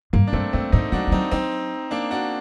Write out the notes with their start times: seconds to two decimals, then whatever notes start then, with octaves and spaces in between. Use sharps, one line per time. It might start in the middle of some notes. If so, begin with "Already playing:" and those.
0.13 G2 A#3
0.27 D4
0.33 G2 A3 C4
0.53 G2 A3 C4
0.72 A2 C4 D#4
0.92 F#3 D4 F#4
1.07 G3
1.12 F#3 C4 D#4
1.32 F#3 C4 D#4
1.91 A#3 D4
2.11 D4 F#4